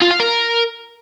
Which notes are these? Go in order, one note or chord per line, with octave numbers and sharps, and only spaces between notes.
F4
F5
A#4